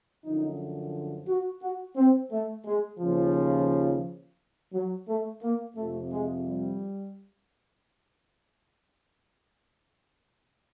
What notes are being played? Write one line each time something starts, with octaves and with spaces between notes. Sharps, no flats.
F#2 D3 F3 D#4
F#4
F#4
C4
A3
G#3
D#2 C#3 F3
F#3
A3
A#3
F2 C3 F3 A3
G#3
G3